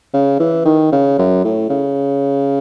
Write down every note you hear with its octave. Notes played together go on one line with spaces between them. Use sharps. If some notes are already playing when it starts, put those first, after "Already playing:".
C#3
E3
D#3
C#3
F#2
A2
C#3